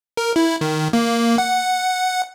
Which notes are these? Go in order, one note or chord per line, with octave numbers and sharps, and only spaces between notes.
A#4
E4
D#3
A#3
F#5